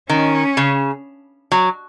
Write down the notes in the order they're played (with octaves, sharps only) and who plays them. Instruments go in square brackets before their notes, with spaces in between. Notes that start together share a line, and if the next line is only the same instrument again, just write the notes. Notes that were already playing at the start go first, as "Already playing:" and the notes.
[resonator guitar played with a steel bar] D#3 [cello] C#4
[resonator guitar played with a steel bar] C#3
F#3